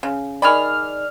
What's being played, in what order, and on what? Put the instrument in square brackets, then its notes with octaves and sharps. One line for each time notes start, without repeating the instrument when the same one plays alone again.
[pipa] C#3
[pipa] D#3 G#4 B5 [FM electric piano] D5 F6